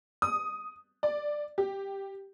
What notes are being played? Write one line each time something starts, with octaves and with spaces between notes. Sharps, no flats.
D#6
D5
G4